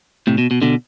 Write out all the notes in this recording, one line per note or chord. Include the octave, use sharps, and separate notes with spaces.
A2 C3
B2
B2
B2 D3